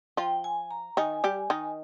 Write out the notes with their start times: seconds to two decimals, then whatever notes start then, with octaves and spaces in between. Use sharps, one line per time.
0.17 F3 F4 G5
0.44 G#5
0.71 A#5
0.97 D#3 D#4 G#5
1.24 G3 G4
1.50 D#3 D#4